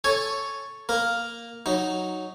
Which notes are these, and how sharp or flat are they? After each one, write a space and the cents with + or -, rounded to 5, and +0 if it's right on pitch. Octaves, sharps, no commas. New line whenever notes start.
A4 +0 C#5 +0 G#5 +0
A#3 +0 A#4 +0
F#3 +0 D#4 +0